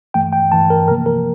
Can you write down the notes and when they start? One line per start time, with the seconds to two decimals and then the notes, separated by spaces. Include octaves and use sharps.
0.14 G2 E3 A3 G5
0.33 G5
0.51 G2 E3 A3 A5
0.70 A#4
0.88 C3 F3 A#3 A#4
1.06 A#4